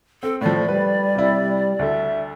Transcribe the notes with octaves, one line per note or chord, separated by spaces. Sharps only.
C4 A4
A2 F3 A3 D5
G3 B4
C3 E4
D2 A4 E5